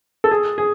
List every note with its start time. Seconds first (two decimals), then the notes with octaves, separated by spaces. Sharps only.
0.24 A4
0.31 G#4
0.58 G#4